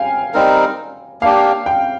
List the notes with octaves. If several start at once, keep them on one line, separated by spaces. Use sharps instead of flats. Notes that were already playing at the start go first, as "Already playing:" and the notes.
Already playing: F5 G5 G#5
G3 C4 D#4 A#4
A#3 D4 G4 F5
G5